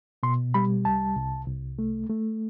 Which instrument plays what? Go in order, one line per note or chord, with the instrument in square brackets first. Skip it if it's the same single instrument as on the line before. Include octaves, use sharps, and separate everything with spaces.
[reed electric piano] B2 C6
G3 B5
C2 A5
C2
C2
A3
A3